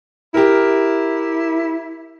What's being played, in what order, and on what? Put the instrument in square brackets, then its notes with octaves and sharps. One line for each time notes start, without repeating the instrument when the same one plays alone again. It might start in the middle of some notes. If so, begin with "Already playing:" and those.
[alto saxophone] E4 [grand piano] G4 A#4